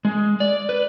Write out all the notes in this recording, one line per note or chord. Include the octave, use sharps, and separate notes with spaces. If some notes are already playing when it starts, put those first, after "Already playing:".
G#3
D5
B4